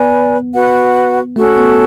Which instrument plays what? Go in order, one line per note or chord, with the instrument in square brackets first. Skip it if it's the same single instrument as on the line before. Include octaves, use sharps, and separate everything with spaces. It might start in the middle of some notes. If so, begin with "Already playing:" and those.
Already playing: [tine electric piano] B3 [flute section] B4 D5 G#5
[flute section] F#4 B4 F#5
[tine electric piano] A3 [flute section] C#4 F#4 A4
[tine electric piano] B3